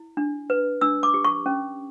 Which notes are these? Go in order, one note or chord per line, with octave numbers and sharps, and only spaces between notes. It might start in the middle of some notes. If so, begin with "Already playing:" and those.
Already playing: E4
D4
B4
D4 E6
D6
G4
C#6
C#4